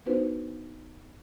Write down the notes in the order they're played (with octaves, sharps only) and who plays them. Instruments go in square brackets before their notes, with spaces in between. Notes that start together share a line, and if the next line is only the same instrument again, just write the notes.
[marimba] B3 D4 D#4 F#4 B4 C5